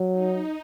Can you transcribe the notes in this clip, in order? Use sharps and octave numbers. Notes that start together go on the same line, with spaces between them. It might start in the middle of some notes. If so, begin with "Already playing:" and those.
Already playing: F#3
D#4